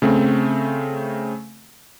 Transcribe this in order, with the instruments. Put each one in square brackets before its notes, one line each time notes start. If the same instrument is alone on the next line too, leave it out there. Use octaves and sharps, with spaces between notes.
[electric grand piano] C#3 A3 C4